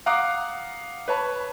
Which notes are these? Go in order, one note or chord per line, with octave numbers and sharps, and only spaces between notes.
F5 F#5 A#5 D6 D#6 F#6
B4 C#5 A5 B5